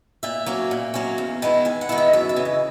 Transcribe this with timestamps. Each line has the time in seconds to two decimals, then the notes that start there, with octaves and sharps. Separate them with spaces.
0.23 A#2 E5
0.46 F#3 A#3 C#4
0.71 A#2
0.94 F#3 A#3 C#4
1.18 E2
1.42 D#3 G#3 B3 E4
1.65 E2 G#5
1.81 F#5
1.89 D#3 G#3 B3 E4
1.98 E5
2.13 F#2 E5
2.29 E5
2.36 C#3 E3
2.45 D#5